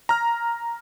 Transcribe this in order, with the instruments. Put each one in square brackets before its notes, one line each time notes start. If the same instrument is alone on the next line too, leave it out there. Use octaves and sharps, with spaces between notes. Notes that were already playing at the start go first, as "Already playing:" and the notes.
[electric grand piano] A#5 F6